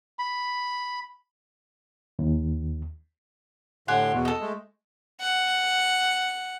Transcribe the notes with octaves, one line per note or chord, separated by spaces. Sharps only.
B5
D#2
A2 D3 G4 F#5 G#5 C6
E2 B2
A4 D#5
G#3 A3
F#5